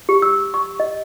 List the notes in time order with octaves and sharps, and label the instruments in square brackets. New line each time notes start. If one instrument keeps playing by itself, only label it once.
[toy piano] G4
E6
C#6
D#5